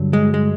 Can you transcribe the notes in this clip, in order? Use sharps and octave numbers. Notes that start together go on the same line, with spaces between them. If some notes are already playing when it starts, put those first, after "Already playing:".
Already playing: G2 D3 F#3
G#3
G#3